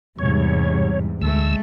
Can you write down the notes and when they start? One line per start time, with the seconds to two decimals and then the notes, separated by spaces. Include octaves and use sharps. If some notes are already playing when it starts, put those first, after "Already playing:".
0.19 E2 G#2 C3 G3 C#5
1.22 D2 G#3 A3 E6